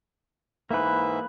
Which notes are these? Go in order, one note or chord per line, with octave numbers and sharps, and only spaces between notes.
G#2 E3 A#3 B4 E5